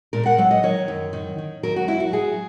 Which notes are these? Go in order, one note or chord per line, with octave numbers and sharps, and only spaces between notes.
A#2 A#4
F#5
F#3 F#5
D#5
D#3 C#5
F#2
D#3
D#3
F#3 A#4
F#4
F#3 E4
F#4
F#3 G#4